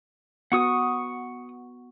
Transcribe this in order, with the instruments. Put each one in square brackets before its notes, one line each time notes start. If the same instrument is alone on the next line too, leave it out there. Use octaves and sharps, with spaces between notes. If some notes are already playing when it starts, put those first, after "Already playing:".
[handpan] B3 F#4 [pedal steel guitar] F#5 C#6 D#6